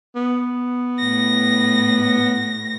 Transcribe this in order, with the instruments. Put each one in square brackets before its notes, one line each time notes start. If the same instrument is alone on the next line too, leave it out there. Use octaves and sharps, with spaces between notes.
[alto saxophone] B3
[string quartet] A2 A#6